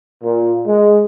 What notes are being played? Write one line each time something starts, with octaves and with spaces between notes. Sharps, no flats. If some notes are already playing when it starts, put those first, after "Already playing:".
A#2
G#3